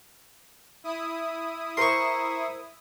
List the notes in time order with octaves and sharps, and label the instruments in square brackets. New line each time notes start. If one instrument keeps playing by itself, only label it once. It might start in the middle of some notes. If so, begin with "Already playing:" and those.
[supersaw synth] E4 D#6
[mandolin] A#4 C5 [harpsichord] C6 C#6